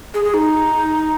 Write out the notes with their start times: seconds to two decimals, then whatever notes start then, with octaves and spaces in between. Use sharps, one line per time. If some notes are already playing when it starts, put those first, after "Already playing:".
0.14 G#4
0.25 G#4
0.34 D#4